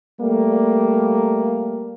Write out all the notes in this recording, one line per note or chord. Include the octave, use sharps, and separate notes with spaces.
G3 A3 A#3